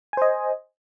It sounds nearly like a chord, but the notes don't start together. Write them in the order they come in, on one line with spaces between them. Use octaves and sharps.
G#5 C5 D#5